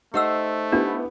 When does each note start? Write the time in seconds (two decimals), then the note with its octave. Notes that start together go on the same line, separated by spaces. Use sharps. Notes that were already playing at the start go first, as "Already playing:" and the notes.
0.14 A3 D#4 G4 C5 F#5 E6
0.72 B3 D4 E4 G4